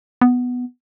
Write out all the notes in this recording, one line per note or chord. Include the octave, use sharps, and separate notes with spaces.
B3